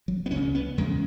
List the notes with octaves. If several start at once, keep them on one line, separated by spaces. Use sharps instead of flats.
F#3
B3
C#2 C#3 C#4
B3
E2 C#3 G#3